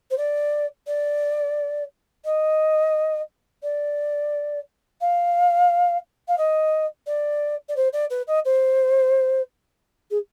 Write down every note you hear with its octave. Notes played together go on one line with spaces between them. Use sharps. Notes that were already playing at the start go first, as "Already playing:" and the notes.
C5
D5
D5
D#5
D5
F5
F5
D#5
D5
D5
C5
D5
B4
D#5
C5
G#4